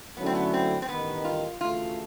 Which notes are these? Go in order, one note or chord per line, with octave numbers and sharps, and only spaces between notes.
D3 F#3 A3 B3 C#4 E4
C4
B3
C4
C4
A1 G2 D#3 B3
F4
D2 C#3 E3 A3 F4